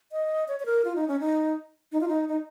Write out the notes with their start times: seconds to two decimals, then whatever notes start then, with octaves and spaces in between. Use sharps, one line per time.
0.12 D#5
0.48 C#5
0.60 C#5
0.66 A#4
0.85 F4
0.96 D#4
1.08 C#4
1.20 D#4
1.92 D#4
2.01 F4
2.08 D#4
2.28 D#4